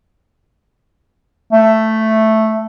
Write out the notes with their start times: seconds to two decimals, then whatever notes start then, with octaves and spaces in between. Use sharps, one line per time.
1.53 A3